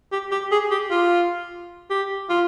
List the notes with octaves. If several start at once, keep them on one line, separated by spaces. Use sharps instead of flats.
G4
G4
G#4
G4
F4
G4
F4